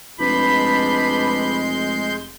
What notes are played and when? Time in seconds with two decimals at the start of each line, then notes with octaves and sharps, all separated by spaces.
0.19 F1 G#3 D4 B4 B5 C6 G6